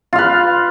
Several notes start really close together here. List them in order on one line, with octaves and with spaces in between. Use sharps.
F4 F5 B4